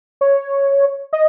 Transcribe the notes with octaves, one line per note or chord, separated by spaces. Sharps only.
C#5
D#5